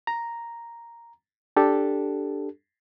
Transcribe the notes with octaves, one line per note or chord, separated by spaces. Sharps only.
A#5
D4 G4 A4